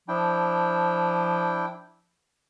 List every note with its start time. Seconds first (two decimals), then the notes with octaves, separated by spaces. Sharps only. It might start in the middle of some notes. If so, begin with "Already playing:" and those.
0.08 F3 D4 E4 G5